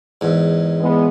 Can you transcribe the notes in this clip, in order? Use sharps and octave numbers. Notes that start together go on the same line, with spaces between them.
E2 G#2
E3 G#3 B3